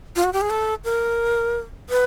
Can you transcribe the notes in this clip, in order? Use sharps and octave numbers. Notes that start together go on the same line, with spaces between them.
F4
F#4
G4
G#4
A4
A#4
B4